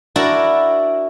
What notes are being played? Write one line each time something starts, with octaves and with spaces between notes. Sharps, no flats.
D4 E4 F#4 A#4 D5